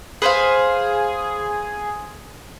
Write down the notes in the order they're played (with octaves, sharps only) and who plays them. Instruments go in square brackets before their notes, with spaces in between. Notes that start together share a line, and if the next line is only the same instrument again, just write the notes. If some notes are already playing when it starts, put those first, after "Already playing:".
[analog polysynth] G#4 [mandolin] B4 C5 F5